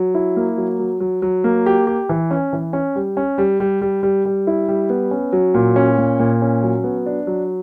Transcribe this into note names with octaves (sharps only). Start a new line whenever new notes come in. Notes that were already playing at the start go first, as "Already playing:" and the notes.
Already playing: F#3
E4
A#3
F#3
F#3
F#3
F#3
A#3
G4
G4
E3
C#4
E3
C#4
G3
C#4
G3
G3
G3
G3
G3
E4
G3
B3
C#4
F#3
A#2
C#4
A#2
A#2
C#4
F#3
B3
D4
F#3